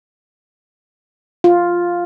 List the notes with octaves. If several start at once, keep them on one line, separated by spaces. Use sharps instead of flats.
F4